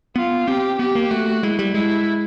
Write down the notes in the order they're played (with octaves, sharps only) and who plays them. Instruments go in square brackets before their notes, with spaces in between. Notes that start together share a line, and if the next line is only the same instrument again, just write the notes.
[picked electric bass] B3 [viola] F4
[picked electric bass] C4 [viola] G4
[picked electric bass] B3 [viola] G4
[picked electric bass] A#3
[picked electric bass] A3 [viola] F#4
[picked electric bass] G#3 [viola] E4
[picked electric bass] G3
[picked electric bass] G#3 [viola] E4